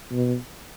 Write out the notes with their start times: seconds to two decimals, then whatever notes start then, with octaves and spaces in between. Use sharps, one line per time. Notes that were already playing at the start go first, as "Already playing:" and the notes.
0.12 B2